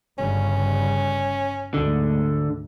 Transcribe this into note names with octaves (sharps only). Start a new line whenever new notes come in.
G1 C#3 G3 C#4
D2 G#2 D3